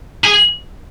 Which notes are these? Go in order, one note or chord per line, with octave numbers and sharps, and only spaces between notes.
G#4